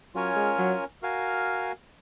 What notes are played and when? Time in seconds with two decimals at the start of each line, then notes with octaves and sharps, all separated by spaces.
0.15 F#3 C#4 F4 A#4 C#5 G#5
0.36 G#3
0.58 F#3
1.02 F#4 A#4 F5 G#5